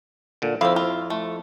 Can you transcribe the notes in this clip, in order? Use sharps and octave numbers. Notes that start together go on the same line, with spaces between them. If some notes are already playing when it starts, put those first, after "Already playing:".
A#2 D3
F2 C4 E4 F5
F4
A3